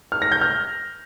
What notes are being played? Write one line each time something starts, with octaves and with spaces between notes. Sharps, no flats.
F6
A#6
G6
F6